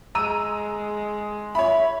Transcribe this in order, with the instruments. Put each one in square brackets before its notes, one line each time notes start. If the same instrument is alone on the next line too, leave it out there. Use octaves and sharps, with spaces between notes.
[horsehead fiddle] G#3 [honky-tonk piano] A#5 E6 D#7
[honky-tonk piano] C#5 B5 [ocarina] E5